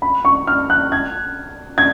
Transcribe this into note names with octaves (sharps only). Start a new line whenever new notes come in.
B5
C#6
F6
F#6
G#6
G#6